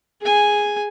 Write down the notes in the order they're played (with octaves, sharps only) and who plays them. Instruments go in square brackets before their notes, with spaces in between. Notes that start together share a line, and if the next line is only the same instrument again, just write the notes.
[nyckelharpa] G#4 G#5